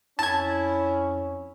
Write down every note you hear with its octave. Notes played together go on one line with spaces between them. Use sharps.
F2 C#4 E4 A5 G#6